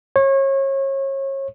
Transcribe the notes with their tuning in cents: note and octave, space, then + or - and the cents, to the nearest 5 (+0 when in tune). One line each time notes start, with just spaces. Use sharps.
C#5 -30